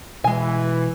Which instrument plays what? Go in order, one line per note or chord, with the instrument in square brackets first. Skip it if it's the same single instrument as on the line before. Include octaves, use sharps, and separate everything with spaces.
[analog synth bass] B2 [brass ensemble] E3 [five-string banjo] G#3 G#5